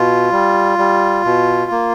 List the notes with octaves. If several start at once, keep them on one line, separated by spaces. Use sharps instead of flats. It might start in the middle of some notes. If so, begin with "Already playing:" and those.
Already playing: B2 F4
G3
G3
B2
A#3